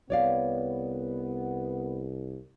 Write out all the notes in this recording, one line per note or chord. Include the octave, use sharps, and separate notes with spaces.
C2 B3 C#5 D5 F5